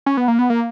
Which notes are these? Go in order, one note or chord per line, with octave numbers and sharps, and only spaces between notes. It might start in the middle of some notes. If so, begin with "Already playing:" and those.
C#4
B3
A#3
B3
A#3